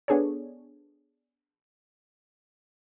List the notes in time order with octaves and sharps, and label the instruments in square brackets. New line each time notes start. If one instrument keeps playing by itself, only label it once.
[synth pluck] B3 D4 G#4 A4 C#5